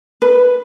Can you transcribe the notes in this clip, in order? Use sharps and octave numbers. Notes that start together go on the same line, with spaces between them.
B4